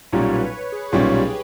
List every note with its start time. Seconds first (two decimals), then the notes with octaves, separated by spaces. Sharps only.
0.12 B1 A#2 G3 C#4 C#5
0.32 B4
0.53 B4
0.72 G#4
0.92 B1 A#2 G3 C#4 G4